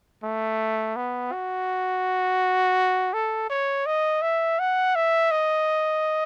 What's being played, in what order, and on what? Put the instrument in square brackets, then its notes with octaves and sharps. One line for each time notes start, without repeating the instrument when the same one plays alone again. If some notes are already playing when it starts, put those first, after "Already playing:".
[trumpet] A3
B3
F#4
A4
C#5
D#5
E5
F#5
E5
D#5